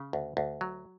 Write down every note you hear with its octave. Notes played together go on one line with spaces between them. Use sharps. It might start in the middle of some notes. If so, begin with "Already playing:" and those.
Already playing: C#3
D2
D2
F#3